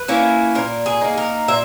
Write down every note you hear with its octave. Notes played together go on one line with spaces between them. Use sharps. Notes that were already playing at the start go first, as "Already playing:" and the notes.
Already playing: B4
A#3 C#4 E4
A#2 A#4
G#4
A#3 D#4
A#4
A#2 E5